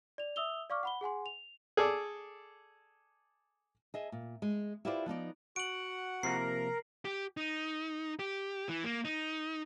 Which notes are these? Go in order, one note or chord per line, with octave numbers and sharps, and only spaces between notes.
D5 F7
E5 D#6 E6 F7 G7
D5 F5 C#6 D6 F6
F#5 B5 G7
G#4 F#5 G#5 C6
F7
G#4 A4 D5
G#4 D#5 E5
A#2
G#3
E4 F4 G4 B4 C5 D5
F3 B3 D#4 D5
F#4 F#5 D7 F#7
C3 F3 A#3 A#4 C7
G4
D#4
G4
E3
A#3
D#4